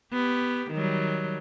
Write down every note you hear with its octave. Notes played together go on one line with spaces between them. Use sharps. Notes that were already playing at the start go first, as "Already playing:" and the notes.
B3 G4
D#3 F#3 G3